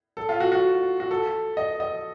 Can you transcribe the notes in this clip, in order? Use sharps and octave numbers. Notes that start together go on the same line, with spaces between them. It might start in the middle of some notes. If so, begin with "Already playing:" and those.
A4
F4
F#4
F#4
F#4
A4
D#5
D#5